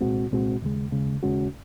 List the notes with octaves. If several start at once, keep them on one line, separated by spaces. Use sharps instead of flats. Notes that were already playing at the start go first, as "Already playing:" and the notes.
C2 A#2 G#3 C4 F#4
C2 A#2 G#3 C4 F#4
D#2 C#3 G#3
D#2 C#3 G#3
D#2 C#3 G#3 C#4 F#4